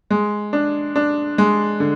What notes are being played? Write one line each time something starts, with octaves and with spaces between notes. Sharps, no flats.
G#3
D4
D4
G#3
D3